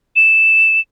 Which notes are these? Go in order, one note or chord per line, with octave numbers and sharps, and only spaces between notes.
E7